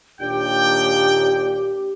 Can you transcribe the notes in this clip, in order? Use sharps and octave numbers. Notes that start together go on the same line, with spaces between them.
D#2 A#2 D4 G4 G5